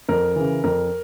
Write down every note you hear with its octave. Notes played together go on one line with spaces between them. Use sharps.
F2 A#4
C#3 E3
F2 A#4